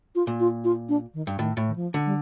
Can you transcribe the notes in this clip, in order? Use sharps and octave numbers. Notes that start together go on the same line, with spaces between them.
F4
A#2
F4
F4
D4
D#3
G2
A2 D#3
A2
D#3
F3
D3
G3